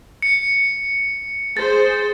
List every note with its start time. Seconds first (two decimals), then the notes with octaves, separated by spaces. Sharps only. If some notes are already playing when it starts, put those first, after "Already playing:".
0.22 C#7
1.57 G#4 C5 A6